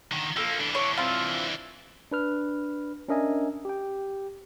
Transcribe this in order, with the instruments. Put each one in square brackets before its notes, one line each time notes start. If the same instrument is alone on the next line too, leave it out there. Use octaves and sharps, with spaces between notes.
[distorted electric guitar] D3 D#3
[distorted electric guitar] F3 A#3 [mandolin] A4
[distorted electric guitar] E3 D4
[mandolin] C#5
C4 F4
[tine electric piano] D4 B4 F6
C#4 D4 A#4 D#5 E5 G#5
G4 G5